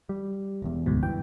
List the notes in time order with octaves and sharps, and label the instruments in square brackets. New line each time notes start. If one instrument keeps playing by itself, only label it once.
[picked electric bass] G3
E1 E2
[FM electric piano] D2 G#2 B2
[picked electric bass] G2 E3 [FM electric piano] G5